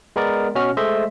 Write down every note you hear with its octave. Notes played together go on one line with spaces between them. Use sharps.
G#3 B3 A#4 D5
B2 C#4 F#4 F6
G#3 A3 C5 D#5 E5